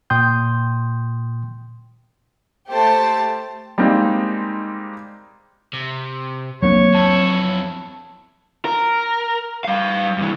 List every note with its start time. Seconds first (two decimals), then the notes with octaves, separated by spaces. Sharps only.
0.10 A#2 G5 C6 D#6 G6
2.69 A3 G4 C5 A5
3.78 G3 G#3 A#3 C4 D#4
5.73 C3
6.62 C2 F#3 A#3 C4 D4 C#5
6.95 F2 E4 A5
8.65 A#4
9.64 G3 F5
10.18 G2 E3